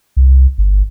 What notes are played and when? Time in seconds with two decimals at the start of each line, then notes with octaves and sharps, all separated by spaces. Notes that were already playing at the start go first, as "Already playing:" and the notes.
0.17 C2
0.58 G1